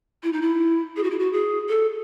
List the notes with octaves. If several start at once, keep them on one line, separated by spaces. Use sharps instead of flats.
E4
D#4
E4
G#4
F#4
E4
F#4
G#4
A4